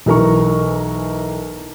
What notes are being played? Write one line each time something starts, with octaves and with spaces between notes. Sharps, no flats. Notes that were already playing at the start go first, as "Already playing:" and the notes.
B1 E3 A#4 A#5 C#6